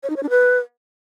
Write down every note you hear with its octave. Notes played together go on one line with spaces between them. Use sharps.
C#5
D#4
C#5
D4
B4